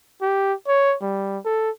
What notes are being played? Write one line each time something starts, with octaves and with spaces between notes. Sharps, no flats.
G4
C#5
G3
A4